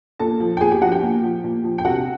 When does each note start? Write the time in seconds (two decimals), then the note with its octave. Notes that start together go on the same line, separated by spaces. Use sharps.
0.19 A#2 A4 A5
0.40 F3
0.57 G5
0.61 A#2 G#4 G#5
0.71 G4 G5
0.81 F3 F#4 F#5
0.92 G4 G5
1.02 A#2
1.23 F3
1.44 A#2
1.64 F3
1.78 G5
1.85 C3 F#4 F#5